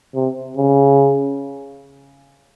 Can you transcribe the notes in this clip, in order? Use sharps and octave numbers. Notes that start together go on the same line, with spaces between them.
C3
C#3